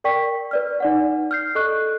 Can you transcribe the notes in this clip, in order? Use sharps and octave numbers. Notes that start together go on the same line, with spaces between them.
A#4 D5 G5 C#6 B6
B4 D5 F6
D#4 D5 F#5
F6 G6 C7
A4 D#5 C#6 F#6